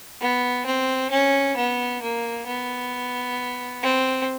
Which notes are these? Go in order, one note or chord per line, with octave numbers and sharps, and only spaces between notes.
B3
C4
C#4
B3
A#3
B3
C4